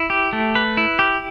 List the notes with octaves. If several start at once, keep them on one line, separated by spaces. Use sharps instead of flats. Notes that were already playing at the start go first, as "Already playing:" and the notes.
Already playing: E4
G4
A3
B4
E4
G4